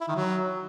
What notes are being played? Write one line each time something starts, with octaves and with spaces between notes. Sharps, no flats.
E4
D#3
F#3